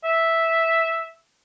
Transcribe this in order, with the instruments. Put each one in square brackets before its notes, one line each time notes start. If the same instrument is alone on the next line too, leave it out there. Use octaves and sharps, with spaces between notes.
[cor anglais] E5